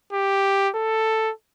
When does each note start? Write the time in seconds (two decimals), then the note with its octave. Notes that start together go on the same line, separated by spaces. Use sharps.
0.13 G4
0.75 A4